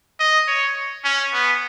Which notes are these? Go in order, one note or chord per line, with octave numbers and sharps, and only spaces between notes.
D#5
C#5
C#4
B3